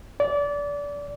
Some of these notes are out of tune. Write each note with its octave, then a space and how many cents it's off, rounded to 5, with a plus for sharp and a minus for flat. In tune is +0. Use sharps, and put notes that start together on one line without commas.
D5 -25